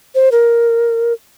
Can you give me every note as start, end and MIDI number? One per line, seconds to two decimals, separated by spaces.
0.15 0.29 72
0.32 1.13 70